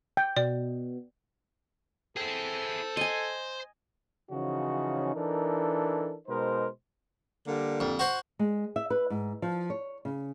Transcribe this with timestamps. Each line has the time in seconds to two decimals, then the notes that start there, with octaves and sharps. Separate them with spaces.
0.17 G5
0.36 B2 D5
2.17 E4 G#4 A4 C5 G5
2.97 D#5 G#5 C6
4.30 C#3 E3 F3 C#4 D#4 F#4
5.14 E3 D4 D#4 A4 A#4
6.28 B2 G#3 D#4 A#4 C5
7.48 D3 G3 A#3
7.80 F2
7.99 F#4 C5
8.39 G#3
8.76 E5
8.90 B4
9.10 G#2
9.42 F3
9.70 C#5
10.05 C#3